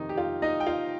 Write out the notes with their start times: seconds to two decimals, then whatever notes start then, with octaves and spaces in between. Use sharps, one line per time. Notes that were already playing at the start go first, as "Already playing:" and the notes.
Already playing: F2 C3 D#3 D#4
0.09 G4
0.18 F4
0.42 D#4 D#5
0.60 G5
0.66 F4 F5